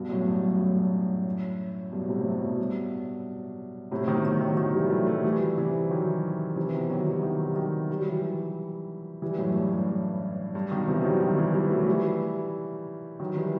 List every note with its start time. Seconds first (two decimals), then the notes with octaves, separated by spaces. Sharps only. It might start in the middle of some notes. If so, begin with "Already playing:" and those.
Already playing: G2 B2
0.09 F#2 A2
0.27 G2
0.43 F#2
0.59 F#2 A2
1.92 G2 B2
2.08 A2 C3
2.26 G2
2.41 G2 B2
3.91 A2 C3
4.08 B2 D#3
4.24 D#3 F#3
4.41 D#3 F#3
4.57 D#3 F#3
4.74 E3 G3
4.90 F#3 A3
5.07 F#3 A3
5.24 E3 G3
5.57 C3 E3
5.90 D#3 F#3
6.56 C3 E3
6.74 B2 D#3
6.89 D#3 F#3
7.06 E3 G3
7.23 D#3 F#3
7.47 G3
7.56 D#3 F#3
7.90 G3
7.99 F#3
8.09 E3 G3
9.22 E3 G3
9.38 F#2 A2
9.55 G2
9.72 G2
10.55 G2
10.71 B2 D#3
10.87 C3 E3
10.99 G3
11.04 D#3 F#3
11.21 D#3 F#3
11.38 E3 G3
11.54 E3 G3
11.71 F#3 A3
11.87 E3 G3
13.20 D#3 F#3
13.36 E3 G3